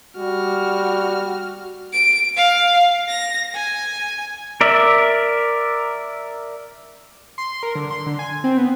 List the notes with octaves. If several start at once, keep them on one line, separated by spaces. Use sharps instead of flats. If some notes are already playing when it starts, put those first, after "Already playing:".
G3 F#4 F6
D7
F5
A#6
G#5
A#4 D5 E5
C6
A#4
D3
C6
D3
G#5
C4
B3